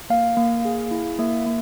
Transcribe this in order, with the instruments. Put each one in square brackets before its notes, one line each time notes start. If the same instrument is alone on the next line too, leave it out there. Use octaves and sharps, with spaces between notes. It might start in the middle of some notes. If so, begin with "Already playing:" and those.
[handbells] A#3 F5
A#3
G#4
E4
A#3 E5
A#3